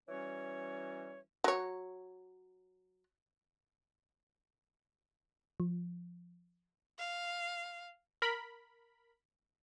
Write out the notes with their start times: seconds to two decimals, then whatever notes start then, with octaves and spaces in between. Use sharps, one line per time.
0.08 E3 G3 C#4 F#4 C#5
1.44 F#3 C#5
5.60 F3
6.99 F5
8.22 A#4 B5